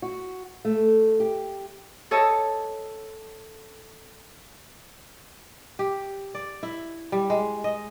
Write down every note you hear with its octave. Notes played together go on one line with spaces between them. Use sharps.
F#4
A3
G4
A4 C#5 D#5 A5
G4
D5
E4
G3
G#3
D#5